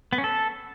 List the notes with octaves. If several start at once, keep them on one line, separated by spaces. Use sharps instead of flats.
B3
C#4
A4